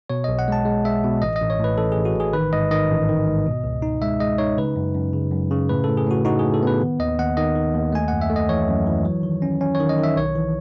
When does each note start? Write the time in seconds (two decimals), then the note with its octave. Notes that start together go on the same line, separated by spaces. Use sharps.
0.10 B2 C#5
0.24 B1 D#5
0.39 F#5
0.48 G#3 A5
0.65 G#3
0.85 G#3 E5
1.04 B2
1.22 A1 D#5
1.36 D#5
1.41 A1
1.50 C#5
1.59 A2 B4
1.78 A1 A4
1.92 A1 G#4
2.05 F#4
2.15 A1 G#4
2.33 D#3 B4
2.53 G#2 D#5
2.71 D#3 D#5
2.90 A1
3.09 D#3
3.27 G#2
3.46 B2
3.64 C#2
3.82 D#4
4.02 G#3 E5
4.20 G#3 D#5
4.38 D#4 C#5
4.58 C#3 B4
4.76 F#2
4.95 F#2
5.13 C#3
5.32 F#2
5.51 C#3
5.69 A2 B4
5.84 A2 A4
5.97 G#4
6.06 A2 F#4
6.25 D#4 F#4
6.39 G#4
6.44 A2
6.54 A4
6.63 B3 B4
6.81 D#3
6.99 D#2 D#5
7.18 D#2 F#5
7.37 D#3 D#5
7.56 D#3
7.74 D#2
7.92 A3 G#5
8.08 F#2 F#5
8.21 E5
8.30 A3
8.36 D#5
8.49 E3 C#5
8.68 F#2
8.87 E3
9.05 F#3
9.23 D#3
9.42 C#4
9.61 C#4
9.75 D#3 C#5
9.89 D#5
9.98 D#3
10.03 E5
10.16 B1 C#5
10.36 E3